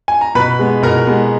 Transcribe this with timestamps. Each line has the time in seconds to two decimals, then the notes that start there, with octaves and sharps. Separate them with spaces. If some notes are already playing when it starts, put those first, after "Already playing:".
0.08 G#5
0.21 A#5
0.35 B2 B4 B5
0.59 G#3 B3
0.83 B2 A#4 A#5
1.07 G#3 B3